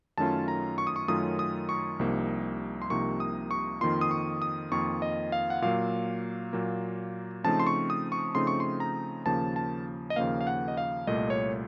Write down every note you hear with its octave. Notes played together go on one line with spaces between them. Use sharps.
F#2 D#3 A3 C#4 F4 A5
A#5
C#6
D#6
C#6
F#2 D#3 A3 C#4 F4 D#6
D#6
C#6
C2 C3 F3 A#3 D#4
C6
C2 C3 F3 A#3 D#4 C#6
D#6
C#6
F2 D#3 A#3 F4 C6
D#6
C#6
D#6
F2 D#3 A#3 F4 C#6
D#5
F5
F#5
A#2 F#3 A#3 F5
A#2 F#3 A#3
C#3 F3 A3 C4 D#4 A5
C6
C#6
D#6
C#6
C#3 F3 A3 C4 D#4 C6
C#6
C6
A#5
D#2 C#3 F3 A#3 A5
A5
D#5
D#2 C#3 F3 A#3 F5
F5
F#5
D#5
F5
C2 A#2 A3 D#5
C#5